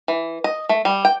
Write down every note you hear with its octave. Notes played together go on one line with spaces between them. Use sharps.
E3
D#5
A3
G3
G5